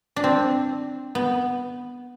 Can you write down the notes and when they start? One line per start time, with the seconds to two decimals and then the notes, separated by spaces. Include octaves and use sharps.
0.16 D4
0.24 C4
1.15 B3